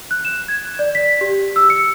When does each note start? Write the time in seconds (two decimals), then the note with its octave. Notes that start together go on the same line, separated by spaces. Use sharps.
0.11 F#6
0.25 E7
0.48 G#6
0.79 D5
0.95 B6
1.21 G4
1.56 E6
1.70 C#7